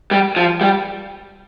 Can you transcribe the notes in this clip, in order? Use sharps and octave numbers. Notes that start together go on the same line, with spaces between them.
G3
F3
G3